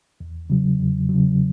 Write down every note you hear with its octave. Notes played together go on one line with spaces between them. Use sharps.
E2
C#3 F#3
E2
C#3 F#3